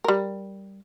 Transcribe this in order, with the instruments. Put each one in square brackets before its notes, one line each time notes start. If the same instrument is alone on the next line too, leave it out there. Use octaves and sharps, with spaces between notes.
[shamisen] G3 A#4